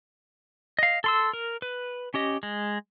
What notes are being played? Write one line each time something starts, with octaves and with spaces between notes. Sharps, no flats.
D#5 F5
A4 C6 E6
A#4
B4
C#4 G4 D#5
G#3